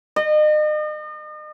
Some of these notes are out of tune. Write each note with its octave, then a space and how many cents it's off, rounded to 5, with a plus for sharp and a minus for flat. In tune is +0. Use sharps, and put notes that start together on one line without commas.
D#5 -40